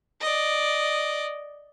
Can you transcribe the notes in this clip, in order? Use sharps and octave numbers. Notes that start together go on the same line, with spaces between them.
D5 D#5